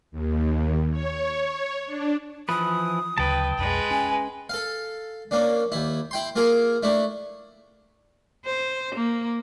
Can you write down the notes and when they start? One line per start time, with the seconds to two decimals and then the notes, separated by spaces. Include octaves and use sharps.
0.12 D#2
0.91 C#5
1.86 D4
2.49 E3 F3 B4 D#6
3.18 D2 C#3 F#3 B4 G5 A5
3.57 B1 F2 G#3 B4
3.91 C#4 G#5
4.50 A4 F5
5.31 A#3 C#4 D4
5.72 D#2 E4
6.11 E4 G5 C6
6.36 A#3 F4 G#4 A#4
6.83 A3 D4 E4
8.46 C5
8.95 A#3